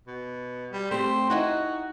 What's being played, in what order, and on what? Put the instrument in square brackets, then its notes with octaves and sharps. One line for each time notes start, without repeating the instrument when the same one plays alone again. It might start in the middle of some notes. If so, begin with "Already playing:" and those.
[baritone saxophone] B2
G3
[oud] A3 G4 [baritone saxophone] C4
[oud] D#4 E4 D#5 [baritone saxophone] F#4